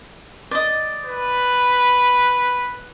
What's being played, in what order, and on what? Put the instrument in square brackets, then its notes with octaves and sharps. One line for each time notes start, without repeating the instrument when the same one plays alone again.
[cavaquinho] D5 D#5
[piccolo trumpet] B4